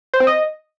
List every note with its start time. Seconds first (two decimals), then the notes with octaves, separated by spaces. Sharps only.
0.14 C5
0.20 C4
0.27 D#5